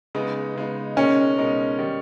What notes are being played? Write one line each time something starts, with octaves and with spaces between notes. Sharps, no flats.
C#3 G#3 B3 D#4
C#3 G#3 B3 D#4
B2 G#3 C#4 D#4 A#4
B2 G#3 D#4 A#4
D#3 G3